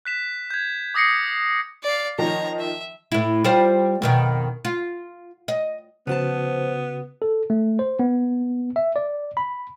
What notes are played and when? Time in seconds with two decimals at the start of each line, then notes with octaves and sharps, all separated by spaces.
0.05 F#6 B6 E7
0.50 G6 G#6
0.94 D6 D#6 A#6 C7 C#7
1.83 D5 F5
2.19 D#3 F3 C#5 D#5 A#5
2.59 E5
3.12 A2 E4
3.44 G3 F4 C5
4.02 F2 B2 D#3
4.65 F4
5.48 D#5
6.07 C#3 F3 B3 F#4 C5 A5
7.22 A4
7.50 A3
7.79 C5
7.99 B3
8.76 E5
8.96 D5
9.37 B5